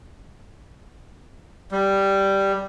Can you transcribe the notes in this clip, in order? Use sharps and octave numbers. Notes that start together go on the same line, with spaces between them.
G3